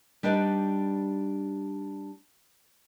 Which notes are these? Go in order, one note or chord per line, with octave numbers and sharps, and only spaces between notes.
G3 D4 D#4 G4 B4